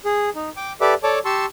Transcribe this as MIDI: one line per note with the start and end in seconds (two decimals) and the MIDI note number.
0.05 0.30 68
0.35 0.50 63
0.56 0.73 79
0.56 0.73 86
0.81 0.94 67
0.81 0.94 69
0.81 0.94 71
0.81 0.94 74
0.81 0.94 76
0.81 0.94 86
1.03 1.19 69
1.03 1.19 73
1.03 1.19 74
1.03 1.19 81
1.03 1.19 86
1.25 1.46 67
1.25 1.46 81
1.25 1.46 84
1.25 1.46 85
1.25 1.46 88